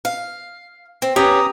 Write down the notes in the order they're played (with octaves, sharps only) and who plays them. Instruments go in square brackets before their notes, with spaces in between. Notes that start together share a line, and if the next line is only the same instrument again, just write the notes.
[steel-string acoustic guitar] F5
C4
[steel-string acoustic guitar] C#4 [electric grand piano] G4 B4 [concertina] A#5 D#6